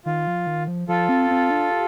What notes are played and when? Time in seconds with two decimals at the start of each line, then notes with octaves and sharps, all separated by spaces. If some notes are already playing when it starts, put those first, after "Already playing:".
0.05 D#3 F4
0.27 F3
0.47 D#3
0.68 F3
0.88 F3 F4 A4
1.09 C4
1.30 C4
1.50 D4
1.71 G4